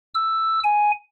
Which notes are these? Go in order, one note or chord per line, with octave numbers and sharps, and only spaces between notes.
E6
G#5